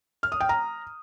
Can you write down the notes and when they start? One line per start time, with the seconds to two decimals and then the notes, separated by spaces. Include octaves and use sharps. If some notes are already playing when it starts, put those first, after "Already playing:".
0.23 F6
0.32 D#6
0.41 G5
0.49 A#5